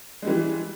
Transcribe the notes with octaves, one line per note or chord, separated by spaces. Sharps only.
E3 G3 G#3